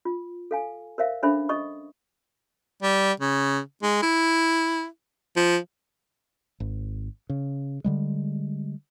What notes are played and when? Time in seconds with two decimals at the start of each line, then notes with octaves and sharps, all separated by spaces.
0.05 F4
0.51 A4 F5 G#5
0.98 A#4 C5 E5 F5
1.22 C#4 D4 A4 C5 E5 B5
1.49 D#5 C#6 D#6
2.83 G3
3.20 C#3
3.82 G#3
4.02 E4
5.36 F3
6.60 G#1
7.29 C#3
7.84 D3 G3 G#3